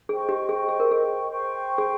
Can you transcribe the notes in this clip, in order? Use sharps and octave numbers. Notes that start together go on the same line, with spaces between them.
G#4 C5 D#5 G5 C#6
G4
G#4
G#4
A#4
G#4
C5 G5 C#6
G#4